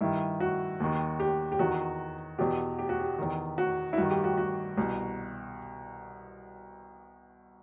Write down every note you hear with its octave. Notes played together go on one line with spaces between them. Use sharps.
G2 D#3 E4
F#4
D#2 D#3
G4
G4
E2 D#3 F#4
E2 B2 G4
G4
F#4
G4
E2 D#3
F#4
E4
G2 D#3 F#4
G4
F#4
F#4
C2 B2